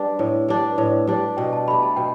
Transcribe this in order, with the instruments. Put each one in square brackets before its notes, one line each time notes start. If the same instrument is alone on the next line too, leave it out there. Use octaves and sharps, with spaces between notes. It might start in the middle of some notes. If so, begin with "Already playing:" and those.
Already playing: [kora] G3 D4 [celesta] B4
[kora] A2
G3 D4
[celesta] B4
[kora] A2 [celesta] D5
[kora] G3 D4
[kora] B2 [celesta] G5
[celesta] A5
[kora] A3 G4 [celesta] B5
[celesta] A5
[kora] B2 [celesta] G5